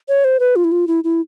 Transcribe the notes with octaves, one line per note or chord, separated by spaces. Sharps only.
C#5
C5
B4
F4
E4
F4
E4
E4